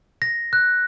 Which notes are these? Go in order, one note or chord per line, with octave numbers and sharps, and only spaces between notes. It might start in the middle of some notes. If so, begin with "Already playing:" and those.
A#6
F#6